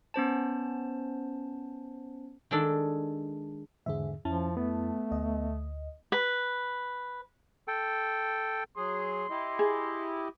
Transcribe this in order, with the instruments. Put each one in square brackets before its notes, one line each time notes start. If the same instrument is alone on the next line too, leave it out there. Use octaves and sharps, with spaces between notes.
[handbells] B3 C#4 C5 A5
[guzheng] D#3 G#3 D4 A4
[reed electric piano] E2 G#2 D3 [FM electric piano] G#4 E5
[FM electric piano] F2 E4 A5 [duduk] F3 [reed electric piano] C#4
[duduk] A3 [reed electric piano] B3
[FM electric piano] D2 D#5
[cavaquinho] B4
[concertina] A4 G5
[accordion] F#3 G#4 [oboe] C6
[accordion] E4 G4 D#5
[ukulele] G#4